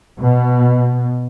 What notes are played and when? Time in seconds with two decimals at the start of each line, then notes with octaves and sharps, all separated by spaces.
0.21 B2